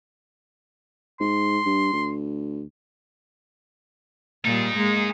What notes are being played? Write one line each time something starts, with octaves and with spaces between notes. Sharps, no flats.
G#2 C6
G2
D2
A#2 G3 D#4 G#4
G#3 A#3